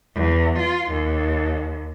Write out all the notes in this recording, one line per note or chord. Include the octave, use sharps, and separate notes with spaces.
E2
F4
D#2